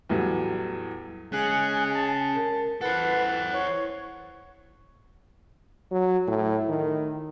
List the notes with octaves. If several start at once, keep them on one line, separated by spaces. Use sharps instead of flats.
E2 A2 F#3 G3
G#3 C#4 G#4 G#5 F#6
A5
A#4
E3 A4 B4 C5 F#5
E3 C#5
F#3
A2
D#3